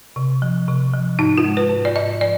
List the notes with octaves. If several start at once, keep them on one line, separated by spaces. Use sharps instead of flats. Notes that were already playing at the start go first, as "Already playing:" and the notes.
C3
F3
C3
F3
G#2 D#4
F4
G#3
B4
G#2
D5
G#2 D#5
F3 D5